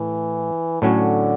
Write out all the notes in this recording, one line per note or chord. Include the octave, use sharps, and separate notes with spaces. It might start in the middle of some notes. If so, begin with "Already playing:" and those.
Already playing: A2 E3
A2 D3 F#3 C#4 F#4